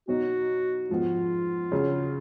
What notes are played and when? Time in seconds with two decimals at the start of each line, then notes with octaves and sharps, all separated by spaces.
0.08 B2 F#3 B3 D#4 F#4
0.89 G#2 F3 B3 F4
1.72 C#3 F#3 C#4